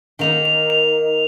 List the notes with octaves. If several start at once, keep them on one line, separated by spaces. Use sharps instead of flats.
D#3 A#3 D#4 F7
F7
F7